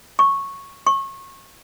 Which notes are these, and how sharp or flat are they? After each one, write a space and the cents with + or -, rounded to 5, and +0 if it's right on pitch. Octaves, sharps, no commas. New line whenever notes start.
C#6 -5
C#6 -30